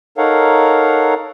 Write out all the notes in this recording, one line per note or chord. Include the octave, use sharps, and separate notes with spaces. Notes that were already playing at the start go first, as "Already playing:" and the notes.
D#4 A4 A#4 C#5 F5 F#5